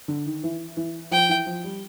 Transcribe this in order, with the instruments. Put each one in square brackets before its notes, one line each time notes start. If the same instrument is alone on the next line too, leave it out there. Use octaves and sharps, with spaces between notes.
[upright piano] D3
D#3
E3
E3
[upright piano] F3 [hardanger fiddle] G5
[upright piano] E3
F3
G3